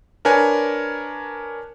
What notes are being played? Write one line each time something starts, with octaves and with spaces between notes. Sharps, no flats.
D4 A#4 B4 C#5 G#5